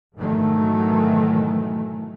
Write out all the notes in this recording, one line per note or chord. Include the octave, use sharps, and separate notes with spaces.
G#2 B2 D#3 E3 F#3 A3